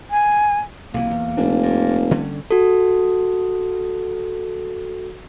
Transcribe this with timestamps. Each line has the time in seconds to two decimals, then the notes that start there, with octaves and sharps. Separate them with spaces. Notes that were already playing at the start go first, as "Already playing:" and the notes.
0.11 G#5
0.94 B1 C3 E3 A#3
1.11 E2
1.37 F1 A#1 D4
1.63 G2
2.11 D3 G3 C#4
2.51 F#4 A4